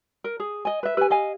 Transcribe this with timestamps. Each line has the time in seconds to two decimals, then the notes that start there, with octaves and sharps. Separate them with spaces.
0.24 A#4
0.40 G#4
0.65 D#5 G#5
0.83 B4 E5
0.97 G4 B4 G#5
1.10 D#5 F5 G#5